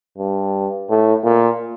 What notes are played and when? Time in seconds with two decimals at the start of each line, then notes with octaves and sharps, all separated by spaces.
0.18 G2
0.89 A2
1.24 A#2